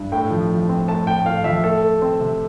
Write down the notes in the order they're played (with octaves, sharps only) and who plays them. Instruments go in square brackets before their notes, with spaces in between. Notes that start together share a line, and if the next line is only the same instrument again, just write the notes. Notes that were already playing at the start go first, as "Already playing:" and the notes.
Already playing: [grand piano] G2
A2 G5
F3
F3
C4
A2 A5
A2 G5
G5
A2 F5
F3 E5
A3 A4
A3
C4
C3